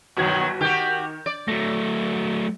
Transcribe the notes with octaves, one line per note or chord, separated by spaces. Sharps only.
G1 B2 D#3 F#3 F#4 G#6
D#3 F#4 G4 G6
D5
F#3 A3 A#6